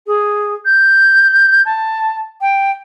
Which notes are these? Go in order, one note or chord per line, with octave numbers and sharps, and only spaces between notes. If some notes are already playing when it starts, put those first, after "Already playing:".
G#4
G6
A5
G5